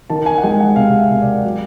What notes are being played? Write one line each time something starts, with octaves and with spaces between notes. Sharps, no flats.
D#3 A5
G#5
F#5
G#3 G5
F#5
C3 F5
F5
E5
C3
D5
F#3